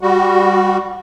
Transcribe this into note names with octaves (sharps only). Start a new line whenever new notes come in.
G3 F#4